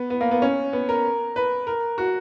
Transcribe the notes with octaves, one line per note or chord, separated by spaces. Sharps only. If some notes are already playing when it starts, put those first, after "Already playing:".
Already playing: B3
B3
A#3
B3
C#4
B3
A#4
B4
A#4
F#4